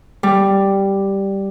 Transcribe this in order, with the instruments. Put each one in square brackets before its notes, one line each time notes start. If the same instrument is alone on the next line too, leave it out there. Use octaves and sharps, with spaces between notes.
[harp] G3